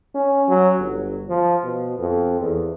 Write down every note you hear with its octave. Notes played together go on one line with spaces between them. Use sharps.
C#4
F#3
G1
F3
B2
F2
E2